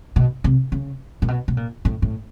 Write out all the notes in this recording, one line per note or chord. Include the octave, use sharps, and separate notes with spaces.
B2
C3
C#3
A#2
B2
B2
A#2
A2
A2